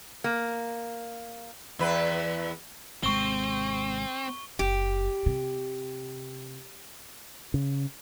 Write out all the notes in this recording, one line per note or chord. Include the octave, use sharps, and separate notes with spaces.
A#3
E2 B4
G#1 C3 G#3 C4 C#6 G7
F#1 G4
C3
C#3